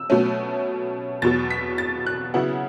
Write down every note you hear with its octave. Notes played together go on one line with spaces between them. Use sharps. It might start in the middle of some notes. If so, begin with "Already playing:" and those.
Already playing: E6
B2 F#3 A3 C#4
E2 B2 F#3 A6
B6
A6
F#6
C#3 F#3 B3 E4 F#5